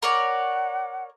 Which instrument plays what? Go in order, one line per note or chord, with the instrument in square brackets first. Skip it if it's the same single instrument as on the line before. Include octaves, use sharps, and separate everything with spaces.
[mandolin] A#4 C#5 D5 [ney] F#5